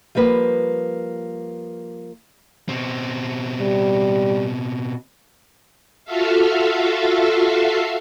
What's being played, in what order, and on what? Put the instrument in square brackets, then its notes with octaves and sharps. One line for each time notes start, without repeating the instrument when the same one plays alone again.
[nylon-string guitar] F3 G3 A#3 B4
[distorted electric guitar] B2 C4
[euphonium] G3
[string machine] F4 F#4 A4 E5 F5